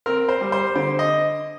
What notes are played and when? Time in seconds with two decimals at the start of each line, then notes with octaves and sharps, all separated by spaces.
0.06 C4 A#4
0.29 C5
0.41 G3
0.52 C5
0.75 D3 C5
0.99 D#5